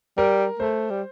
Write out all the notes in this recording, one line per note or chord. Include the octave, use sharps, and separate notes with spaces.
G3 A#4
A3 C5
G3